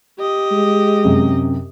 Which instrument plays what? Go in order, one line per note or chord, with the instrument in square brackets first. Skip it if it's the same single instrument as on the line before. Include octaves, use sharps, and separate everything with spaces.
[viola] G4 D#5
[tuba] G#3
[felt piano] F#2 C3